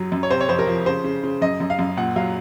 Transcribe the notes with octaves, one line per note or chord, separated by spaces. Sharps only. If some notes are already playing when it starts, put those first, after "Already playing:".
Already playing: F#2 F#3
F#2
C#5
C3 C5
C#5
F2 C5
A#4
F3
C#3 C5
C#3
C#3
F#2 D#5
F#2
F5
F#2
A#2 F#5
F#3 F5